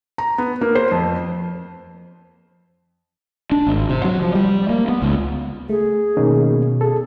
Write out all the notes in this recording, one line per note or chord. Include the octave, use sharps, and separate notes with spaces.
A#5
B3
A#3
C5
F2
D4
G#1
C3
F#3
F3
G3
A#3
B3
C#2
A3 G#4
B2 D#3 A#3 C#4 D#4
B2
G#4 A4